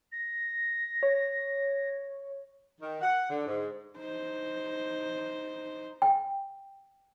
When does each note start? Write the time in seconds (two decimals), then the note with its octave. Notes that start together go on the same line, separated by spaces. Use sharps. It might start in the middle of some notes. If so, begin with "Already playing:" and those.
0.12 A#6
1.03 C#5
2.80 D#3
3.01 F#5
3.29 D3
3.46 G#2
3.98 D#4 C5
6.02 G5